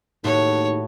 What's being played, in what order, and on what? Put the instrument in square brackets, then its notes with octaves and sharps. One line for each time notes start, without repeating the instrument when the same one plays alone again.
[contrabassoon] D#2 [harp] A2 A3 F#4 [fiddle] C#5